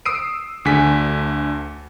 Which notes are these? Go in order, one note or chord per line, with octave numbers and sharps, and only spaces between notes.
D#6 E6 C7 D7 D#7
D2 D3 G#4 G#5 B6